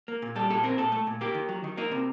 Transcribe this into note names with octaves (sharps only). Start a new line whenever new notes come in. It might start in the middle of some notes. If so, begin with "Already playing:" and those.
A#3
A#2
G3 A4
A#2 A4
C4 A#4
A#2 A4
A3
A#2
A#3 G4
D#3
F#3
D#3
A#3 D#4
C3